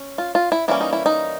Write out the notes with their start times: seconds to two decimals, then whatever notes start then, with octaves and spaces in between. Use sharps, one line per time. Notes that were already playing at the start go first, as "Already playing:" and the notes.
Already playing: C#4
0.18 F4
0.35 F4
0.52 E4
0.68 E3 G3 A#3 C#4 E4
0.81 D#4
0.93 E4
1.06 D#4